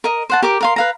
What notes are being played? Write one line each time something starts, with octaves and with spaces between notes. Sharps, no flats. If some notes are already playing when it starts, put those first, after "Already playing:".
A#4 D#5
C5 F#5 A5
G4 A#4 D6
A#4 F5 C6
B4 F5 A#5